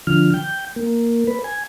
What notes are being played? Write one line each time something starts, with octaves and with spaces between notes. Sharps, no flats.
D3 F3 F6
G5
A#3
B4
G#5